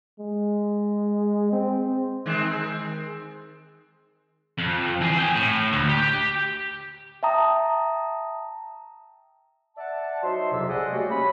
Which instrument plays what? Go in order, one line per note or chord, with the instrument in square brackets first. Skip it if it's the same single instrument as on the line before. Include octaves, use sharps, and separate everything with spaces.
[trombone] G#3
C4
[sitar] D#3 G#3 C4
[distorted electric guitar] F2
E3 G#4
G#4 G5
A2
D2
G4
[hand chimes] E5 G5 A5 A#5 D#6
[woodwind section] D5 E5 F#5 A5
F#3 D#4 C5 E5 C6
C2 F2 C3 F#3 E5 D6
G#4 C5 D5 D#5 F#5
F#3 G3 A3 A#3 F#4 G4
C#4 C#5 B5